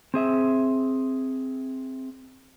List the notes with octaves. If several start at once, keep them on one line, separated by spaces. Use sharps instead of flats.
C4 G#4 E5